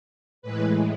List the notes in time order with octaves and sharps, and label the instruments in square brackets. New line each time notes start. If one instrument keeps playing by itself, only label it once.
[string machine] A2 E3 G#3 B4